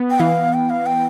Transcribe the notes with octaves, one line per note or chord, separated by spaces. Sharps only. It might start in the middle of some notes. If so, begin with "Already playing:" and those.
Already playing: B3
G5
E3 F5
G5
F5
G5